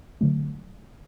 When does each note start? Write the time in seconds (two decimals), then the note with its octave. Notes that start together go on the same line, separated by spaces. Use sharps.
0.21 D3 F#3 A3